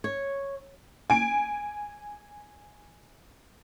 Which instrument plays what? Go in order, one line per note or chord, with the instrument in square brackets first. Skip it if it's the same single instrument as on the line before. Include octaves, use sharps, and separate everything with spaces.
[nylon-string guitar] C#5
[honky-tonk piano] G#5 D7